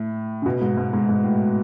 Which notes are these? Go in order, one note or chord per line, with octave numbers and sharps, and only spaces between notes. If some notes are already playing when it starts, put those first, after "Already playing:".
Already playing: A2
C#3
B2
G#2
G#2
G#2
G#2
A2